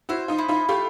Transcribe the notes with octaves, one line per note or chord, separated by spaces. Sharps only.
E4 F#4 C5
D#4 F4
E4
D#4 F4
A3 F4 G4